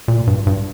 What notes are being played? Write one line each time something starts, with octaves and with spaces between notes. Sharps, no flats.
A#2
G2
G2